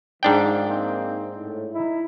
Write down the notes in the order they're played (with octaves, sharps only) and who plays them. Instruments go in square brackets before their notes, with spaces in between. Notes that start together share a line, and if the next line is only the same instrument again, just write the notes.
[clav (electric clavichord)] G#2 D4 G5 [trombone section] D#3 F3
[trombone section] A#3 C4 D#4
A2
D#4 E4